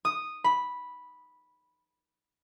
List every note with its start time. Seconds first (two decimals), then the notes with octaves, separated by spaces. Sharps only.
0.05 D#6
0.44 B5